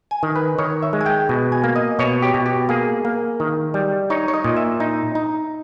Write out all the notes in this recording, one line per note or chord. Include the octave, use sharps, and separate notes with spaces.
G#5
D#3
B4
D#3 C#5
E5
G#3
G#5
G5
B2
G#5
A#3
D#5
B2 C#5
G4
B2
G4
A#3 G#4
A#3
D#3
G3
D#4 C#5
C#5
D#5
A#2
E5
D#4
D#4